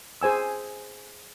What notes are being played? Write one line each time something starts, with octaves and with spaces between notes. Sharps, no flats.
G#4 C5 G#5 E6